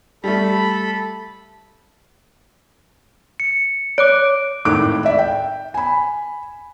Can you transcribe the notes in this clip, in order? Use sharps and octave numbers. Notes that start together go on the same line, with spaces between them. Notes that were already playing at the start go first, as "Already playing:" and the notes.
G3 A3 A4 B5
C#7
C#5 D6 F#6 D7
G#1 A2 D#3 D6 F#6 D7
D5 E5
G5
G#5 B5